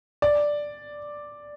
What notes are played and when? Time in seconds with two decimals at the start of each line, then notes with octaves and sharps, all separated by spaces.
0.22 D5